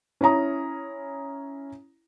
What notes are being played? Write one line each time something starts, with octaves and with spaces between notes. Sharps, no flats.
C#4 E4 C#5 A#5 D#6